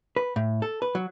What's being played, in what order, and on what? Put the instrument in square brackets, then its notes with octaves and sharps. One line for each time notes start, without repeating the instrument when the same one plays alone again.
[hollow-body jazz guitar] B4
A2
A4
B4
F#3